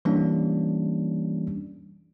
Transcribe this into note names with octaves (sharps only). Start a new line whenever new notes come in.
E3 G3 A#3 C#4 D4